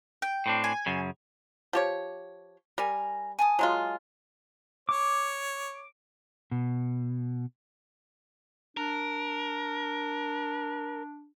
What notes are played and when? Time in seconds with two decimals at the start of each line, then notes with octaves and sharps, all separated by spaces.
0.22 G5
0.46 A2 C4 D4
0.64 G#5
0.86 F#2 C#3
1.73 F3 G4 C#5
2.78 G3 A#4 G#5
3.39 G#5 A5 D#6
3.59 F#3 G#3 F4
4.89 C#5 D6
6.51 B2
8.77 D4 A#4